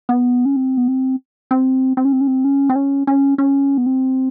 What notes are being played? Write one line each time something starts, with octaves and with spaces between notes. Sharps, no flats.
B3
C#4
C4
B3
C4
C4
C4
C#4
C4
C#4
C4
C#4
C4
C#4
C#4
C#4
B3
C4